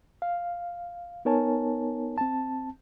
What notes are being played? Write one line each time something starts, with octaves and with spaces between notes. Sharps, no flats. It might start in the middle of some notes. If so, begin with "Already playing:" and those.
F5
B3 D#4 A#4 C#5 G#5 A5
C4 A5